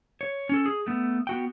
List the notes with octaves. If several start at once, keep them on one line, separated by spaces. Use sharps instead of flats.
C#5
C#4 A4
G#4
A3 B3
B3 F#4 G5